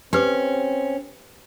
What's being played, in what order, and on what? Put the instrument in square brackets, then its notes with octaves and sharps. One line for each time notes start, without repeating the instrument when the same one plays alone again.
[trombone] C4 [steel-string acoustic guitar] C#4 [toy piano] G4 B4 D6